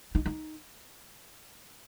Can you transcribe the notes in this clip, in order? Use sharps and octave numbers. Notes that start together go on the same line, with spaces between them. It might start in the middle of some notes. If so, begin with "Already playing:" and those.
D#4
D#4